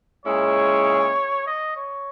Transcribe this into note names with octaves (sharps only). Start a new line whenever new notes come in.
A#2 G#3 C#4 E4 G#4 C#5
D#5
C#5